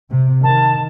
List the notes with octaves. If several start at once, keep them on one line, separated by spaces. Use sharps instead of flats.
C3
D#3 A5